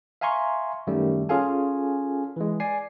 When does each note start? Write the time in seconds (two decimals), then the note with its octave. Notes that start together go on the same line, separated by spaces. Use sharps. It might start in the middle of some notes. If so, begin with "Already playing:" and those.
0.21 E5 F5 G#5 A#5 C6 C#6
0.87 F#2 D#3 G3 A3
1.29 C#4 F4 G#4 A4 F5 G#5
2.36 E3 G#3
2.60 D5 G#5 C7